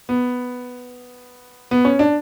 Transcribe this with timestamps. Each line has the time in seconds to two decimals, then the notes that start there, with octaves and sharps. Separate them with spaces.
0.09 B3
1.71 B3
1.85 C#4
1.99 D4